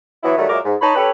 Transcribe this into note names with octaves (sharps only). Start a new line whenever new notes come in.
E3 F#3 B3 E4
D#3 F#3 G3 A3
A#2 F#3 G#3 A#4 E5 D6
G#2
D#4 C#5 A5 B5
C#4 G4 A4 B4 C#5